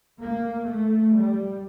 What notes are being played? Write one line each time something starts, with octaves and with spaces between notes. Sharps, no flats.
A#3
A3
G3